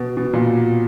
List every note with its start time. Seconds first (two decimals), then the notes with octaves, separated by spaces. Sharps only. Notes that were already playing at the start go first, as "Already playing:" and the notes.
Already playing: B2
0.17 B2
0.33 A#2